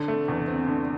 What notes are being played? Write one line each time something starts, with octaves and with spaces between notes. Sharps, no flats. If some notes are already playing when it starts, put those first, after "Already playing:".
Already playing: D3
A3
E2
C4
D3